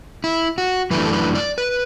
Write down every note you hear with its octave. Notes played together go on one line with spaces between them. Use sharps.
E4
F#4
F#2 E3 A3 D4 B4
A4
B4
D5
B4